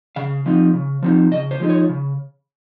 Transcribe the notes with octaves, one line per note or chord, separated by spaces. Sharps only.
C#3 F5
F3 C4 D#4
C#3
F3 C4 D#4
C#3 D#5
C5
F3 G#3 C4 D#4
C#5
C#3